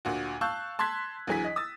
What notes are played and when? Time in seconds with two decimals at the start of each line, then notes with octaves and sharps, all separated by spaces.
0.05 D2 A#2 F#4
0.41 F5 A5 C#6 E6 F#6 G6
0.79 A5 C6 F#6 G#6 B6
1.27 D2 E3 F#3 G#4 G#5 B6
1.44 D#5
1.56 D#6 E6 A6